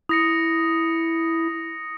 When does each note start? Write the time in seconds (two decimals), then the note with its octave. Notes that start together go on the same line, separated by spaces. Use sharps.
0.09 E4 D#6 A#6 C#7